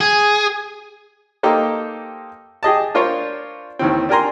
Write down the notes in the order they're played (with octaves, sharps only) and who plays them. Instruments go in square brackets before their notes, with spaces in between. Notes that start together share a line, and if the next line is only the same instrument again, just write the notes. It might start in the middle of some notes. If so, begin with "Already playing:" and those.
[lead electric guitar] G#4
[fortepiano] A#3 D#4 G4 A4 C5
G4 G#4 D#5 A5
D4 F4 A#4 C5 C#5
D#2 D#3 E3 C4
D4 G4 A#4 G#5 A#5 C6